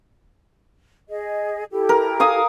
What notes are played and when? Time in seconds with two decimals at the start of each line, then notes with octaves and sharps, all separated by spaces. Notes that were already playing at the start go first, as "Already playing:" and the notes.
1.09 G#4 D#5
1.71 E4 G4 A4
1.89 A#4
2.20 F5 G#5 D#6